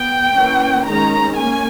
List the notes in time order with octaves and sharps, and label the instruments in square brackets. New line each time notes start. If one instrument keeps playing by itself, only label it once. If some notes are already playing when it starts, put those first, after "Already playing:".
Already playing: [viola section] B3 G5
E3 A#3 C#4
D#3 G#3 C#4 A#5
A#3 C#4 G#5